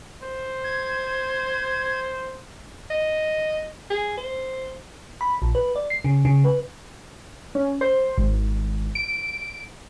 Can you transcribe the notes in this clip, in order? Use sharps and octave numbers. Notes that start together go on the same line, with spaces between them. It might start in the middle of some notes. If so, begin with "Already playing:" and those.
C5
G#6
D#5
G#4
C5
B5
A#1
B4
D5
C7
C#3
C#3
B4
C#4
C5
G#1
D7